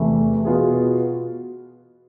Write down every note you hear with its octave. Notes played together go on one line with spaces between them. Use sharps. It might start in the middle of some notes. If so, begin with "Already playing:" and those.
Already playing: E2 C3 E3 A3 E4
B2 B3 F4 G#4